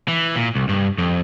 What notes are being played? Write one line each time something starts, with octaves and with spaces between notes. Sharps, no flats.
E3
A#2
C2
G2
F2